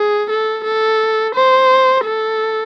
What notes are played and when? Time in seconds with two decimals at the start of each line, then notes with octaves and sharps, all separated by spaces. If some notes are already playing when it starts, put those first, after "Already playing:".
Already playing: G#4
0.30 A4
0.64 A4
1.35 C5
2.04 A4